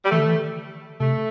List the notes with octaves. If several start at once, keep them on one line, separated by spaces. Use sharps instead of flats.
G3
E3 A3
D3
E3
C3 A3